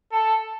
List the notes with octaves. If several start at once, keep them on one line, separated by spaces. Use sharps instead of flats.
A4